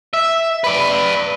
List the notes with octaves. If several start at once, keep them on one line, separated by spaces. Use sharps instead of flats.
E5
B4 D5